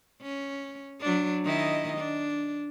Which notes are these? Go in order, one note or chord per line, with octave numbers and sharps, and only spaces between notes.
C#4
F#3 D4
D#3 E4 D#5
D4